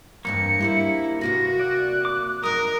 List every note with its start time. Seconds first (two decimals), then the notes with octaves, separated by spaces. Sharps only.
0.25 E2 G2 A#3 C4 D#4 C#7
0.60 E4 G4 B4 C5
1.21 C3 A#3 F#4 B4 A#6
1.60 D5 F#6
2.05 D6
2.44 F#2 D#4 A#4 D#6